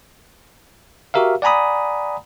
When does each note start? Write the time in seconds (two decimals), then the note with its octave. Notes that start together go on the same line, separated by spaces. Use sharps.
1.14 F#4 G4 A#4 E5 F5
1.42 D5 F#5 G#5 A#5 B5 D#6